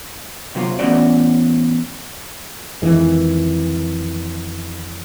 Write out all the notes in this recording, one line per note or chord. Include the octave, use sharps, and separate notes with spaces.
C3 F#3 F4
E2 A2 E3 C#4 F#4 D5
F2 D#3 E3 G#3